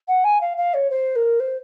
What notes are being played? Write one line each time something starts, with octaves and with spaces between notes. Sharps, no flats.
F#5
G#5
F5
F5
C#5
C5
A#4
C5